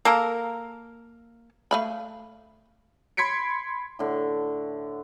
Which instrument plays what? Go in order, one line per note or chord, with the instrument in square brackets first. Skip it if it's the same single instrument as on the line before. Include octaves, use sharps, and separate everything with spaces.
[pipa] A#3 A4 A#4
[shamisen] A3 F5 B5
[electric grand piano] B5 C6 G#6 B6 C#7 D7
[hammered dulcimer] A2 D3